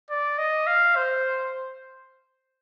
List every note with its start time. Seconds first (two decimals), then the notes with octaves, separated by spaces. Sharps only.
0.10 D5
0.38 D#5
0.67 F5
0.96 C5